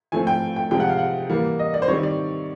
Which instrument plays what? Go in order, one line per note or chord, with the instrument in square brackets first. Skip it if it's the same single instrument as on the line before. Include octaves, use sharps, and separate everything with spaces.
[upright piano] F3 A3 C4 G#5
G5
G5
C3 F3 G#3 G5
F#5
F5
F#5
E3 G3 A#3
D#5
D5
C5
D#3 G3 C4 C#5
D5